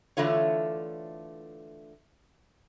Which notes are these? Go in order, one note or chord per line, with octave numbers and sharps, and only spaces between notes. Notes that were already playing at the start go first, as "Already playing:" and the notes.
D3 E3 A3 F4 C#5